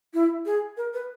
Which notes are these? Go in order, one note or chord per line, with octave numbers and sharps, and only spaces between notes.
E4
G#4
A#4
B4